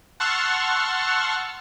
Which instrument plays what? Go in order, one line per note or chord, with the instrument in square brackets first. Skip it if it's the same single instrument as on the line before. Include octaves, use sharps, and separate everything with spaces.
[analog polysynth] F#5 A5 C6 C#6 E6 F6